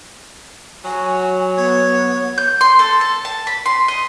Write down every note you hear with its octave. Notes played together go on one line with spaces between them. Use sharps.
F#3 F#4 G#5
B3 C#5
G6
C6
A4
A5
A5
B5
C6
D#5